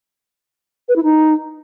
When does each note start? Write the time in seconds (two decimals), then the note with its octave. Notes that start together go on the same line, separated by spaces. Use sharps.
0.88 B4
0.96 E4
1.03 D#4